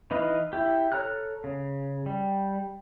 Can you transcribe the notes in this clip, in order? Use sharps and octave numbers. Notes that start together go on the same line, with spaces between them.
E3 D#4 B4 D#5 F5
E4 G4
A4 C#5 A#5 F6 F#6
C#3
G3